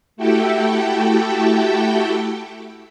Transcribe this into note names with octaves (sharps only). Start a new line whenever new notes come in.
A3 E4 F#4 G4 A4 G5